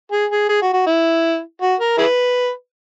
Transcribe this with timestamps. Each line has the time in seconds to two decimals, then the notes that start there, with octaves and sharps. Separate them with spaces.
0.12 G#4
0.31 G#4
0.49 G#4
0.62 F#4
0.74 F#4
0.86 E4
1.62 F#4
1.80 A#4
1.98 E4 G#4 B4